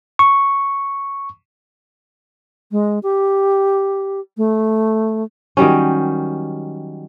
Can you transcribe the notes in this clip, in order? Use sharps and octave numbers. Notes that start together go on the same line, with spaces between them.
C#6
G#3
G4
A3
D#3 F#3 G3 C#4